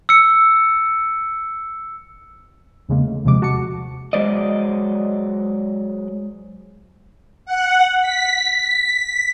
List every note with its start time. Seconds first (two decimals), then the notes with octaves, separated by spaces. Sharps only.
0.09 E6 C#7
2.89 E2 C#3 G#3 A#3
3.07 A3
3.25 D#2 C3 F3 G#3 D6
3.42 F#4 A5 D6 C#7
4.13 F#3 G#3 C5 D5 D#5
7.46 F#5
8.01 B6